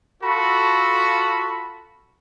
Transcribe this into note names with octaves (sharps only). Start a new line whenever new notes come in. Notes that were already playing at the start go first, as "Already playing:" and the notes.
F4 F#4 A4 B5